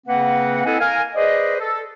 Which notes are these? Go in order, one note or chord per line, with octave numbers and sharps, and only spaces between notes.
C#3 A#3 C4 B4 F#5
C4 E4 A4 D#5 F#5 G#5
A#4 F5 G#5
G#4 B4 C5 D5 D#5
A4